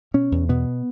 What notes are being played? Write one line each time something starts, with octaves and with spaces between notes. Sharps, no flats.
B2 C#4
E2
B2 B3